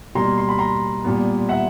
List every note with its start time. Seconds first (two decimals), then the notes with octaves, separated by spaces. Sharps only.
0.15 B2 G3 A#3 A#5 C6
0.38 C6
0.49 B5
0.59 A#5 C6
1.04 A#2 G3 B3
1.49 E5 F#5